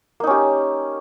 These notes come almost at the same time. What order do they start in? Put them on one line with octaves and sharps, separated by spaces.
A#3 D#4 C#4 G4